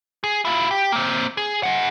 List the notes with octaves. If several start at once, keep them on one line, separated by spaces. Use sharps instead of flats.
G#4
E4 F4
G4
A#3 C4
G#4
G#4 F#5